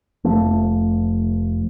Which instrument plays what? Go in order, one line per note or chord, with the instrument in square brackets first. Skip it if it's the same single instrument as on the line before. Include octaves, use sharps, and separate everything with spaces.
[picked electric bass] F1 F3 A3